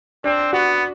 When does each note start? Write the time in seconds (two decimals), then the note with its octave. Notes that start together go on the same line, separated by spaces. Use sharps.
0.24 C4 D4
0.53 B3 F#4